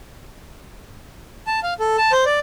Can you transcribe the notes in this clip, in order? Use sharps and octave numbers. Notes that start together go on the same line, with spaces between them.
A5
F5
A4
A5
C5
D5